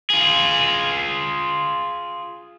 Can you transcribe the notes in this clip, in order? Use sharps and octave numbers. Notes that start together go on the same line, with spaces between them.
F4 G#4